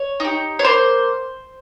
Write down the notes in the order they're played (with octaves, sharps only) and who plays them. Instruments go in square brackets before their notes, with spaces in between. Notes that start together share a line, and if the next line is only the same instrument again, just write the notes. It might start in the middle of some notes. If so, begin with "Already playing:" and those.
Already playing: [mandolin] C#5
D#4 G4
C#5
A#3 C5